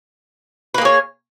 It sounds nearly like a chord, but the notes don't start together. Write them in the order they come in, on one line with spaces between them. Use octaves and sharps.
B4 A#3 G#4 C#5